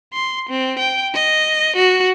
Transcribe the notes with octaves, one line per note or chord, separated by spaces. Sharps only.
C6
C4
G5
D#5
F#4